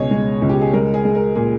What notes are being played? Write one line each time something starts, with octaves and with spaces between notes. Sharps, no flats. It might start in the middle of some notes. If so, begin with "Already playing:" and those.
Already playing: C#2 B2 G#4 C#5 D#5
G#3
C#2
G4
G#4
G#3 A#4
G#4
G#3
A#4
A#2 G#4